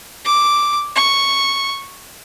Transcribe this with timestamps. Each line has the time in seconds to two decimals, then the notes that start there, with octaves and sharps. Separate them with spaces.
0.25 D6
0.95 C#6